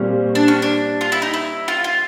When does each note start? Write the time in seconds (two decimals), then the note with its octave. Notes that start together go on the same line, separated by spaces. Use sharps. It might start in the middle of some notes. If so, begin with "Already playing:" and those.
Already playing: A#2 G3 C4 C#4
0.35 D4
0.48 C#4
0.62 D4
1.01 F4
1.12 E4
1.22 D#4
1.34 E4
1.68 F4
1.84 F4